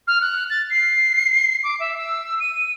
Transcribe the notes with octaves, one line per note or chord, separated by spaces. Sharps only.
F6
F#6
A6
C7
D6
E5
E6
D#7